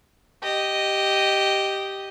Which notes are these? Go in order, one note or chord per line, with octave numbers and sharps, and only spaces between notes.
G4 D#5